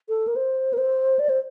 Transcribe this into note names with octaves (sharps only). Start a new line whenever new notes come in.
A4
A#4
C5
A#4
C5
D5
C5